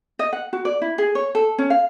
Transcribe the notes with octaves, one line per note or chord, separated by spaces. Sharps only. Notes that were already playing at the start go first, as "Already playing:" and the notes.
D#5
F#5
F#4
D5
E4
G#4
C#5
A4
C#4
F5